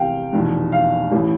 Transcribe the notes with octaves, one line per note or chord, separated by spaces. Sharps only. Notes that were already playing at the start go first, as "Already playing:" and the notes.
Already playing: E2 C3 F3 F5 G5
F1 E2 B2
F5
A1 A2 E3